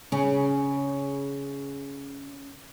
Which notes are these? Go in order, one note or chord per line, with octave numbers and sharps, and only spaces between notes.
C#3 C#4